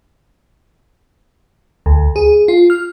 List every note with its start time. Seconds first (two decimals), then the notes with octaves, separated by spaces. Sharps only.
1.86 D2
2.16 G#4
2.48 F4
2.70 F6